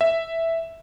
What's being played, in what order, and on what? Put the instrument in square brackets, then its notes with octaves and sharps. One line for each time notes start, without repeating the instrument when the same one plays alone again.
[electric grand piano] E5